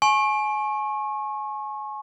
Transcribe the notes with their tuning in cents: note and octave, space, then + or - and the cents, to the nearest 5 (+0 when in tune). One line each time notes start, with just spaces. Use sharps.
G#5 +30 C#6 -30